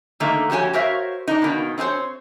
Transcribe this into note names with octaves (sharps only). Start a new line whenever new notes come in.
D3 D#3 A3 A#3
F2 F#4 G4 C#5 G#5
F#4 A#4 C5 C#5 E5 F5
D4 D#4
B2 D#3 A#3
C4 D#4 G#4 C5 C#5